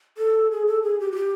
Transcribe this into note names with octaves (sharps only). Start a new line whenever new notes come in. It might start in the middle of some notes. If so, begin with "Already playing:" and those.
A4
G#4
A4
G#4
G4
F#4
G4